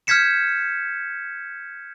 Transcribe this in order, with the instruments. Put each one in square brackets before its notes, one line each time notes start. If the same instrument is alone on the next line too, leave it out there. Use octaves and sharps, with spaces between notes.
[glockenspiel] F6 G6 G#6 B6 C#7 E7